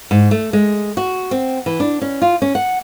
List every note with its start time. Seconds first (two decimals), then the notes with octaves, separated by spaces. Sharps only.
0.11 G#2
0.31 A3
0.53 G#3
0.97 F#4
1.31 C4
1.66 E3
1.80 D4
2.02 C#4
2.22 F4
2.42 C#4
2.55 F#5